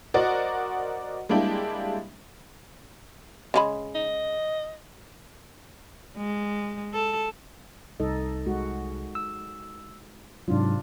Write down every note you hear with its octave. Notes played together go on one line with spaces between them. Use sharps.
F#4 A#4 C5 D5 D#5 F#5
G3 G#3 A#3 D4 E4 G4
C#3 G#3 B5
D#5
G#3
A4
C2 D#4 A4 D#5
G#3 F#4
E6
G#2 C3 F#3 D4 F4